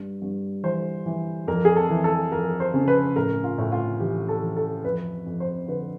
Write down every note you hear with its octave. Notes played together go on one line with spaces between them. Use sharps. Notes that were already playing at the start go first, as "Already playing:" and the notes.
Already playing: G2
G2
E3 C5
E3
F2 A#4
G#4
A4
E3
A4
F2 A#4
C5
C#3
B4
A2 A#4
F4
A2
F4
E3 G4
A4
E3
A4
F2 B4
F2
C5
D3 B4